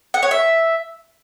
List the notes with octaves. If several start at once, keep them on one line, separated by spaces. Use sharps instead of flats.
F#5
C#5
E5